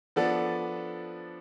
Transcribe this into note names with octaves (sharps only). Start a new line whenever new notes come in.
F3 B3 D4 A4